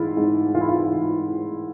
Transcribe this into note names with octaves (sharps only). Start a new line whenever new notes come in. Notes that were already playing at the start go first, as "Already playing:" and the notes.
Already playing: G#2 E3 E4 F4
G#2
E3 F4
E4
F4
E3
E3